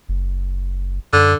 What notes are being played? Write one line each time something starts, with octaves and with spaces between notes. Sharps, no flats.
F#1
F#2 D3